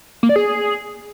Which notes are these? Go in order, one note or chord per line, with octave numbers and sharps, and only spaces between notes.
A#3
D5
G#4